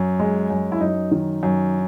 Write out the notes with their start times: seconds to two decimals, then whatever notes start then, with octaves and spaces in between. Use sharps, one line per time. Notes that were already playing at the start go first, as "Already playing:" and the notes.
Already playing: F#2
0.19 G#3
0.50 F#2
0.72 E4
0.81 F#2 D#4
1.11 D#3
1.43 F#2